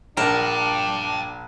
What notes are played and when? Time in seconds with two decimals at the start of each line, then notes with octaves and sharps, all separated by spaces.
0.17 A#1 D4 A#4 G5 A5